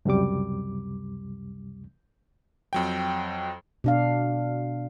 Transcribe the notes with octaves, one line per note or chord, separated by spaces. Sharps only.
C#2 F#2 C3 G3 D6
F2 F#3 G5
B2 D4 F5